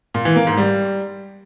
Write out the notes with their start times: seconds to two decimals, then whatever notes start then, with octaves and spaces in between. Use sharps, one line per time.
0.14 A#2
0.25 E3
0.36 A#3
0.47 G#2
0.58 G3